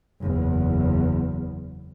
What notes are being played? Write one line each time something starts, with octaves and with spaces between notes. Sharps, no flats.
F#1 E2